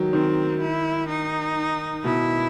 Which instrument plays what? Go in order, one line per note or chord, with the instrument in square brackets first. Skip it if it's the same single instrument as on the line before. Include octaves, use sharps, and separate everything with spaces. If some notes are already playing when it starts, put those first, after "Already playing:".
Already playing: [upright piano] D#3 F#3
[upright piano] D#3 [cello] C4
[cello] E4
D#4
[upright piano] B2 [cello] E4